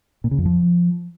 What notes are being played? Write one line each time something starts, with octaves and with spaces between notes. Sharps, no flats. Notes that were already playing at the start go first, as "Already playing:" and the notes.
A#2
C#3
F2
F3